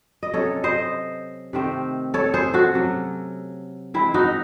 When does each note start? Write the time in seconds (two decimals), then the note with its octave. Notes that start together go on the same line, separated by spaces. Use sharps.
0.23 D#5
0.33 C3 F#3 C#4 A4 C#5
0.64 C5 D#5
1.53 C3 D#3 A3 C4
2.14 A4 C#5
2.34 G#4 C5
2.54 F#4 A4
2.74 C3 F#3 C#4
3.94 E3 G#3 C4 E4
4.14 D#4 F#4